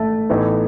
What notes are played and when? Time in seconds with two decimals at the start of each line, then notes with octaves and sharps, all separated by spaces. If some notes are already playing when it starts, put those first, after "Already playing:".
Already playing: A1 G#2 A3
0.30 A1 A2 E3 B3 D#4